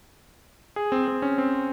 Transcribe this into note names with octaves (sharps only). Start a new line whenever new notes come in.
G#4
C4
C4
C#4
C4